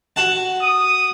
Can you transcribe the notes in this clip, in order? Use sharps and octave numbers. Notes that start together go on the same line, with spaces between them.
F#4 F#5 A5
D#6